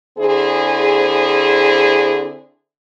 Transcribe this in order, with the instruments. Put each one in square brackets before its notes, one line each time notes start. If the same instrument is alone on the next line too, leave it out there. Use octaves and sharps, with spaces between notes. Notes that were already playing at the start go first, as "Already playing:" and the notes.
[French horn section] D3 C4 E4 G#4